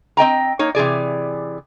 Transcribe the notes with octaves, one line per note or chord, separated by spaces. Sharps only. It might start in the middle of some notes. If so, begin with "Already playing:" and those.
C4 D#5 G5 A#5
A#3 D#4 C#5
C3 E3 G#4 D5